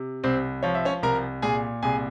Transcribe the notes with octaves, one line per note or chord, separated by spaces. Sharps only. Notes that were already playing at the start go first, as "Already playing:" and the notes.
Already playing: C3
C2 C4 C5
F3 C#5
E5
C#4 C#5
C2 A#4 A#5
A#2 G#4 G#5
C2 G#4 G#5